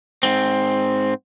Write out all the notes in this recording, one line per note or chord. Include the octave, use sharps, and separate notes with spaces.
G#2 C4